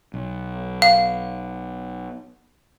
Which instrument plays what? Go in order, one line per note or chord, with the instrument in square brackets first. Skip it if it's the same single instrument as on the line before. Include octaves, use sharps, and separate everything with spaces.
[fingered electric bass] B1
[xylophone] F5